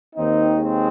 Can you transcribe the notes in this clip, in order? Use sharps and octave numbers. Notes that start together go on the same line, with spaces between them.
D#2 D#3 C4 D#4
G#3 C4